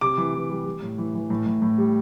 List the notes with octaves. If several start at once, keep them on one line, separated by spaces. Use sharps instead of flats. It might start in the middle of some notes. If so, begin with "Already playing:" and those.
C3 D6
E3
E3
G3
G3
A2
E3
E3
A2
A2
A2
G3